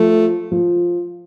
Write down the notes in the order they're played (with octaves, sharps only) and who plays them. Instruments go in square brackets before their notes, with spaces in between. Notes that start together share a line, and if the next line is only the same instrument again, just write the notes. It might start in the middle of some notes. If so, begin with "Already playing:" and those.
Already playing: [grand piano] F3 [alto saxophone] A3
[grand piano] F3